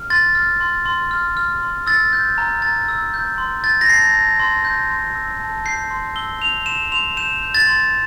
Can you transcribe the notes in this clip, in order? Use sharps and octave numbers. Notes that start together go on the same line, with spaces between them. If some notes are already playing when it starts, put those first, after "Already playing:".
Already playing: F6
C6 A6
F6
C6
C6
F6
F6
C6
E6 A6
G6
A#5
A#5 A6
E6
G6
C6
G6 A6
A#6
A5 C7
A5
C6
G6
C6
E6
A5
G6 C7
C6
E6 G7
G6 F7
C6 E7
C6 F7
G6 E7
G6
A6
C6